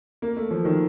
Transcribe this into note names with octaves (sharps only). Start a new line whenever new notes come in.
A#3
A3
F3
D#3